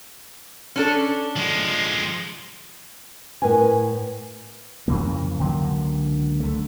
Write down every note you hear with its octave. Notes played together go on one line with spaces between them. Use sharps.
C#4 D4 A4
F3 G#3
A2 A#4 B4 G#5
F2 C#3 E3 A#3
C#2 D3 F#3 A#3
D3 A3